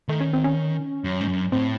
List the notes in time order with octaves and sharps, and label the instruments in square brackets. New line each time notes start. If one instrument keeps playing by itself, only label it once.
[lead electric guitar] D#3 [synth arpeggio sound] A3
[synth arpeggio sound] C#4
C4
C#4
[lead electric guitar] F#2
G#2
F#2
[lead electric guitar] A2 [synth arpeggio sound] C4